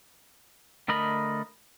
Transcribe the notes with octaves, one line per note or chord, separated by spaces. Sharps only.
D3 A3 A#4 D#5 B5